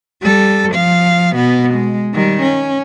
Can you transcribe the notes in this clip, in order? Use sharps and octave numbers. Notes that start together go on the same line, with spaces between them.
G3 A4
F3 F5
B2 B3
G#3
D#3 G3
C#4